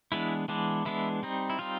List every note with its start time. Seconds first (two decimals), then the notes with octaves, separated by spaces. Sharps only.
0.12 E3 G#3 B3 D4 E4
0.48 E3 G#3 B3 D4
0.85 E3 G#3 B3 D4 E4
1.23 G3 C4 D#4
1.50 E4
1.59 G3 C4 D#4 F4